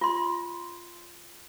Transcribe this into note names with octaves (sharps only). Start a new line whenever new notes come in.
F4 C6